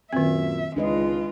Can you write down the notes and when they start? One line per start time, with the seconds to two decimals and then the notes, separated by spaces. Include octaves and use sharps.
0.13 F#2 A#2 D#3 C4 E5
0.76 C#2 G#3 D4 D#4 F4 B4 D#5